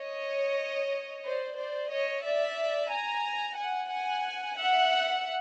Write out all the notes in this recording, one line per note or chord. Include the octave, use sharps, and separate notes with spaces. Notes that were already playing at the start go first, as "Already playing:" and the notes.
Already playing: C#5 D#5
C5 D5
C5 D5
C#5 D#5
D5 E5
G#5 A#5
F#5 G#5
F#5 G#5
E5 F#5